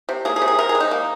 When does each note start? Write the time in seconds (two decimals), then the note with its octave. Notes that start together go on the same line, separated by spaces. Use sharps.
0.09 C3
0.25 A#3 G#4
0.36 G#4
0.42 C3
0.48 G#4
0.58 C3 A#4
0.69 G#4
0.75 G#3
0.80 D#4
0.91 A#3